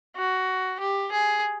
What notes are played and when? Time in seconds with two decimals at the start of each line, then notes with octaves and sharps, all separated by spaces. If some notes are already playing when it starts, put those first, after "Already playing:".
0.16 F#4
0.80 G4
1.12 G#4